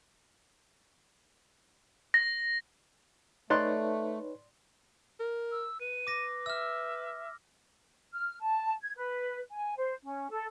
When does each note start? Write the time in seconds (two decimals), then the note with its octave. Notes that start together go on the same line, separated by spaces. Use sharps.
2.14 A#6
3.50 A3 D#4 B4 C#5 D5 C6 F#6
5.20 A#4
5.52 E6
5.81 B4 D#7
6.07 D6 A#6
6.46 E5 E6 F6
8.13 F6
8.41 A5
8.83 G#6
8.96 B4
9.50 G#5
9.77 C5
10.03 C#4
10.29 A4